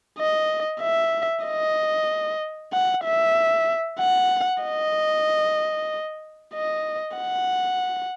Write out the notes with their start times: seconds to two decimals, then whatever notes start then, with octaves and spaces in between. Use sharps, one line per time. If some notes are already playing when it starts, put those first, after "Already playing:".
0.19 D#5
0.81 E5
1.45 D#5
2.73 F#5
3.05 E5
4.00 F#5
4.64 D#5
6.55 D#5
7.18 F#5